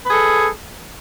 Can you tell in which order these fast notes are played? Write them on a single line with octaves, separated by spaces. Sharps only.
B4 G#4 A4